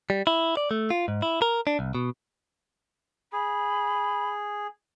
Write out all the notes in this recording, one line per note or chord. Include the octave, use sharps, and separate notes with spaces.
G3
E4
D5
A3
F4
G#2
E4
A#4
D4
C2
B2
G#4 B5